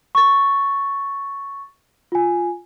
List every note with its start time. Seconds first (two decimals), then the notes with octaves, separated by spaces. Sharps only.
0.15 C#6 A6
2.12 F4 G#5